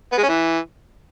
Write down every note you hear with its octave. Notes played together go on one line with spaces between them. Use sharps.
B3
G#3
C#4
E3